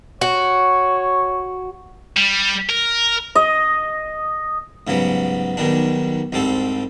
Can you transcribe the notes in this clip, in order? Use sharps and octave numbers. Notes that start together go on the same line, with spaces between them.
F#4 C#5
G3
A#4
D#5
G#2 C#3 F#3 G3 B3
B1 B2 D#3 G3 D4
C2 G#2 G3 C4 A4